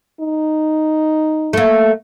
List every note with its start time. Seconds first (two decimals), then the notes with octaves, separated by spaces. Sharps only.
0.20 D#4
1.53 A3 A#3